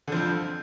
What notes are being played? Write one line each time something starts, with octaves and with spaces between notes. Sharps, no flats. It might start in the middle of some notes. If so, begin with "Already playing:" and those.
F2 D3 F3